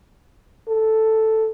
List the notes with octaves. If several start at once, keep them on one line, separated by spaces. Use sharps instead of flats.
A4